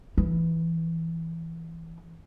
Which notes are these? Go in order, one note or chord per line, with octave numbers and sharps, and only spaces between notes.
E3